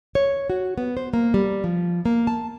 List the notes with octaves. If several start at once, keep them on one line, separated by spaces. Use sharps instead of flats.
C#5
F#4
B3
C5
A#3
G3
F3
A#3
A5